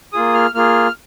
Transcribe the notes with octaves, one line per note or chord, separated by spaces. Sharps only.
A#3 F4 G#4 D#6
F6
A#3 F4 G#4 F6